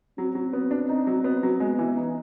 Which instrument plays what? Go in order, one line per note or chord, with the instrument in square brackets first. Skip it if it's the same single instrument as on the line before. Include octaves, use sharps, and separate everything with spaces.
[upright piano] F#3 [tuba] C4
[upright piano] F#3
B3
D4
[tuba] C4 [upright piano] D#4
[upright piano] F#3
B3
F#3
[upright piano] G#3 [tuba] B3
[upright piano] E3
D#4